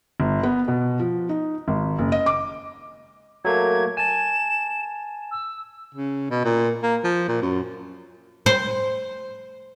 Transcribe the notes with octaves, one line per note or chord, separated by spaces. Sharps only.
G1
B3
B2
F3
D#4
G#1
F#1
D#5
D6
F#3 A3 A#3 G#6
G#5 A5 E7
E6
C#3
B2
A#2
A#3
F3
A#2
F#2
C5